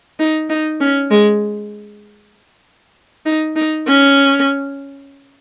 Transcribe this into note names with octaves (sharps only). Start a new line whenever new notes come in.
D#4
D#4
C#4
G#3
D#4
D#4
C#4